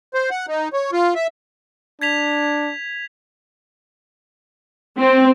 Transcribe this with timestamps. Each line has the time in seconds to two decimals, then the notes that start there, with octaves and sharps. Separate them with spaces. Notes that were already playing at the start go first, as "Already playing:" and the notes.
0.14 C5
0.31 F#5
0.48 D#4
0.73 C#5
0.92 F4
1.15 E5
2.02 D4 G#6 B6 F7
5.00 C4